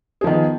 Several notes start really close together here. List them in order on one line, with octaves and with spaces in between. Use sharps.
G#4 F3 D#3 B3